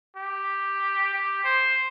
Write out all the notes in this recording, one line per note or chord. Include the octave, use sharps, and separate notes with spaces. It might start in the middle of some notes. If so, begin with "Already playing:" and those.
G4
G4
C5